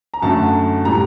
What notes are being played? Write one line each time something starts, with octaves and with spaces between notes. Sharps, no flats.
A#5
F#2 D3 A3 A5
A2 G3 A#5